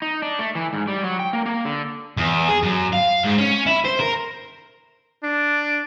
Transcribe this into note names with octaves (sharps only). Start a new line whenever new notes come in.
D#4
D4
A3
E3
G#2
G3
F#3
G5
A#3
A#3
D3
E2
G#4
F#2
F5
G#2
C#4
E4
C5
A#4
D4